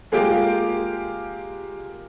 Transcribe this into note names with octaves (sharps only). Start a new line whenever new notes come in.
G#3 A#3 F4 G4